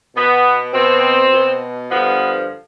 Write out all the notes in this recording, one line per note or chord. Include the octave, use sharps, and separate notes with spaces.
B2 B3
B2 C4
B2
G2 D3 F3 B3